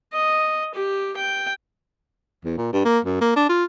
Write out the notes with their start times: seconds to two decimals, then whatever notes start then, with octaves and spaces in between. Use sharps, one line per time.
0.13 D#5
0.75 G4
1.17 G5
2.45 E2
2.58 A#2
2.73 G2
2.84 A#3
3.05 F#2
3.21 A#3
3.36 D4
3.49 F4